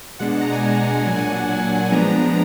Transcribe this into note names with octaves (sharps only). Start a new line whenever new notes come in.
B2 G#3 D4 F#5
F#5
A#5
G#5
B2 G#3 D4 G#5
A#5
G#5
A#2 F#3 D4 G#5
F#5
G#5
F#5
A#2 F#3 D4 G#5
F3 G#3 B3 D4 A#5